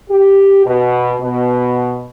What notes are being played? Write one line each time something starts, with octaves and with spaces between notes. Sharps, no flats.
G4
B2
B2